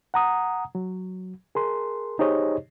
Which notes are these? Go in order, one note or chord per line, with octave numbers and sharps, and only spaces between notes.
F#5 A#5 D#6
F#3
G#4 A#4 C6
D#4 G4 G#4 C5 C#5 D#5